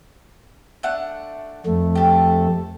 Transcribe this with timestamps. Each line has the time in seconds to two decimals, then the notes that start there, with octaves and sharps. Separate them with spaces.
0.83 A3 D4 F#5
1.66 F2 A3
1.95 G4 A4